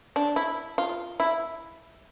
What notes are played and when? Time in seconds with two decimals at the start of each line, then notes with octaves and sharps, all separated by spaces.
0.16 D4
0.36 E4
0.78 F4
1.20 E4